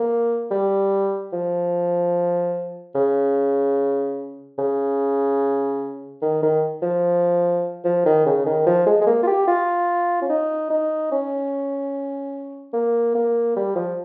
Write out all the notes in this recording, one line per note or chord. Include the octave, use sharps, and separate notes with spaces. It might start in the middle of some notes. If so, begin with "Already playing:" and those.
Already playing: A#3
G3
F3
C#3
C#3
D#3
D#3
F3
F3
D#3
C#3
D#3
F3
G#3
G#3
A#3
F4
G4
F4
C#4
D#4
D#4
C#4
A#3
A#3
G3
F3